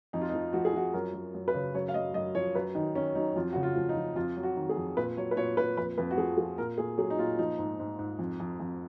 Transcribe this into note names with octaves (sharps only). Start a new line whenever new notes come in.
F2 D#4
F4
D#4
F3
F3 F#4
G#4
F3 F#4
F#2 A#4
F#2
F#2
B4
C#3
F#2 C#5
F5
F#2 D#5
F#2 D#5
F3 C#5
F#2 B4
D#3 D#4
D#3 C#4
F#3 D#4
F2 F4
C#3 F#4
F4
F3
D#4
F3
F2 F4
F#3
F#4
D#3
G#4
F2
A#2 B4
F#3 C#5
B4
A#2 C#5
A#2 B4
F2 B4
F2 B4
F#4
F3 G#4
F3 G#4
A#2 A#4
A#2 G#4
F#3 G#4
D#4
A#2 F4
F3 D#4
G#2
G#2
G#2
F2
F2
F2